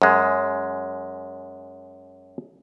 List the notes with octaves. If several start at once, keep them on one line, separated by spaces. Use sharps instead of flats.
F#2 G#3